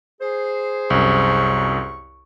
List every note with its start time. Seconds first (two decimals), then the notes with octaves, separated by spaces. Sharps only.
0.22 G#4 C5
0.90 C2 F#2 C#6